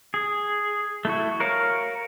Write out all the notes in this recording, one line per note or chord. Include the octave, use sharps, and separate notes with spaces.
G#4
A3 E4 F#4
F#4 A#4 C#5 F5